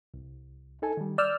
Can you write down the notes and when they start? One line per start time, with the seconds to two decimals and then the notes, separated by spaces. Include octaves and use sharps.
0.14 C2
0.82 D#4 A4 G#5
0.97 D#3 G3
1.18 D5 E6 F6 G6